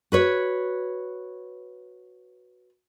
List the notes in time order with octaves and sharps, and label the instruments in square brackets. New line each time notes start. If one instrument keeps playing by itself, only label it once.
[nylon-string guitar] F#4 B4 C#5